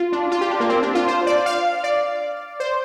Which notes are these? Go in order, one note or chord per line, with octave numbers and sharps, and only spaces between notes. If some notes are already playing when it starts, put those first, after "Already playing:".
Already playing: F4
D4
F4
G4
D4
A#3
C4
D4
F4
C5
D5
F5
D5
C5